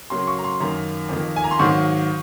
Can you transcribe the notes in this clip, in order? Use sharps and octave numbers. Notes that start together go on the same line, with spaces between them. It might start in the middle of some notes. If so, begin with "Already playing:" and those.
C#3 F#3 A#3 C6
C#6
A#5
C6
F#2 D#3 A#3 A#5
F2 D#3 A#3
G#5
A#5
C6
G#2 D#3 F#3 A#3 C#6